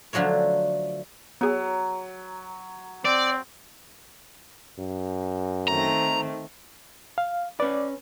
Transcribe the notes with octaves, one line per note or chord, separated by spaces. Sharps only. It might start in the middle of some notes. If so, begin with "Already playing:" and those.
D3 F3 F#3 A3 C#5
F#3 B3 G#4
C4 D5
F#2
D#3 A3 C4 A#5
F5
C#4 B4 D5